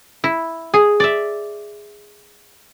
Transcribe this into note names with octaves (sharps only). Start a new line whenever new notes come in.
E4
G#4
D5 E5